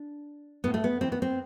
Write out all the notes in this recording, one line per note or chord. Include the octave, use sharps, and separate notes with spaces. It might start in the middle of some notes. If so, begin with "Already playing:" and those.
Already playing: D4
A2 B3
A3
B3
E3 C4
B3
C4